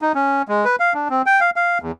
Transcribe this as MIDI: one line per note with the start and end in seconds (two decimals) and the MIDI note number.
0.02 0.12 63
0.15 0.42 61
0.48 0.65 56
0.65 0.76 71
0.80 0.93 77
0.94 1.08 62
1.10 1.22 60
1.26 1.40 79
1.41 1.50 77
1.56 1.78 77
1.82 1.92 40